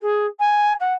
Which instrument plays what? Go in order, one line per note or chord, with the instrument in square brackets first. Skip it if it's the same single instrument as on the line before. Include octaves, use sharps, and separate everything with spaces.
[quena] G#4
G#5
F#5